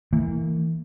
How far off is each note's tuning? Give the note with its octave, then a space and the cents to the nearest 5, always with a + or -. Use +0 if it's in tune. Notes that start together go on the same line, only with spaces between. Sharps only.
E3 -20 A#3 -35